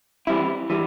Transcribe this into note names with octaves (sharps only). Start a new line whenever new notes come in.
E3 G3 C4 E4
E3 G3